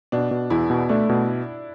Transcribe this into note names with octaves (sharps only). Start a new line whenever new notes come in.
B2 D4
B2
E2 E4
B2
A3 D4
B2